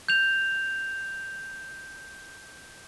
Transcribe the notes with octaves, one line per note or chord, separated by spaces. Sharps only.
G6 F7